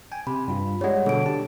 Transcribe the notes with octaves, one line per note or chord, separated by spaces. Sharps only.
G5 G#5
C3 B5
G2 F4
G3 G#3 C#5 F#5
B2 D3 A4 D7
D4 G4 A5